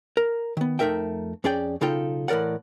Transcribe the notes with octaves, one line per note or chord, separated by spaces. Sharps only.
A#4
D#3 B3
F2 A3 D#4 A#4 E5 G5
F2 C#4 G#4 D5 G5
B1 C#3 D#4 F4 A4 G5
A2 E3 A#4 D5 F#5